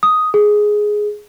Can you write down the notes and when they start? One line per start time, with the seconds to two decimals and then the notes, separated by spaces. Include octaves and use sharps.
0.03 D#6
0.34 G#4